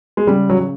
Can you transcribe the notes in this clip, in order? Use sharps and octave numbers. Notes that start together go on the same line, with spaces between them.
G#3
C#3 G3
F#3
F#3